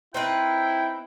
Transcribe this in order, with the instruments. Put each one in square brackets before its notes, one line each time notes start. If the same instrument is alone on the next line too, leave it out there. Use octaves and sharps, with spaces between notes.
[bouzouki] C4 D#4 B4 [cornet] E4 [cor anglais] G5